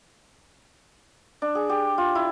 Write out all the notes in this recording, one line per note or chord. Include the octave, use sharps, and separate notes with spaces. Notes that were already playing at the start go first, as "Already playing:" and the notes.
D4
G#4
G4
F4
E4